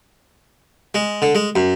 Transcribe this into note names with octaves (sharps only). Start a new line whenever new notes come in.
G#3
D3
G#3
F#2